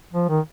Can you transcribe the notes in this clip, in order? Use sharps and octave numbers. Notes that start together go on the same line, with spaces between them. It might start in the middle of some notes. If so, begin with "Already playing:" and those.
F3
D#3